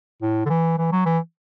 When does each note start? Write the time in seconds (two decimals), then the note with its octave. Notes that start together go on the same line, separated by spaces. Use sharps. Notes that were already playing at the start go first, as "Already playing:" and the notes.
0.22 A2
0.46 D3
0.50 E3
0.78 E3
0.92 F#3
1.06 E3